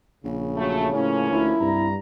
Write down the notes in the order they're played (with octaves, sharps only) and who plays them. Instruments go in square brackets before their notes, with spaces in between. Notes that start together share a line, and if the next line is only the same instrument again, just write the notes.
[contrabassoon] A#1 [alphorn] C#3
[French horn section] F#3 A3
[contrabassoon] A2 [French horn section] F3 A#3 C#4
[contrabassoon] D2 [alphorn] E4
[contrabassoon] C2 [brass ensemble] G2 A#5